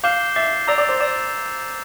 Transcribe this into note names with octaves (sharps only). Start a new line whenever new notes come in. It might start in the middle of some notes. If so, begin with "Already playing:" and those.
F5 D6 G6 C7 E7 G7
E5 D6 A6 C7
D5 A#5 E6 A#6 F7
D5
C5
D5 E6 A6 E7